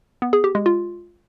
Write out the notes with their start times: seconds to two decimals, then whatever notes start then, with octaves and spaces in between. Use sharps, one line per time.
0.22 B3
0.33 G#4
0.44 G4
0.55 G#3
0.66 F4